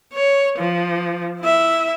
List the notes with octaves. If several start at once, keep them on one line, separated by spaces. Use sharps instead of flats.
C#5
F3
E4 E5